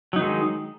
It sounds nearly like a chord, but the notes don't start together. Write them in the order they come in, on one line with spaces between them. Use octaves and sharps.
F#3 D#4 D#3 G#3